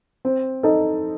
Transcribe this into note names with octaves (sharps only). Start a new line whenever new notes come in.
C4
D#4 A4 D#5